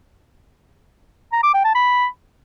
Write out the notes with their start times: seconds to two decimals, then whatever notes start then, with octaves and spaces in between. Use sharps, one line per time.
1.33 A#5
1.43 D6
1.54 G5
1.65 A5
1.75 B5